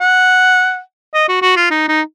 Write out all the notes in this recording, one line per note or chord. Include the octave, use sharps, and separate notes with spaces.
F#5
D#5
F#4
F#4
F4
D#4
D#4